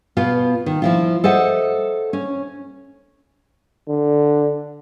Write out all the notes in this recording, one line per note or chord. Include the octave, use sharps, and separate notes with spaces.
B2 B3 F4 F5
D#3
F3 E4 F4
A4 C5 D#5 E5 F#5
C#4
D3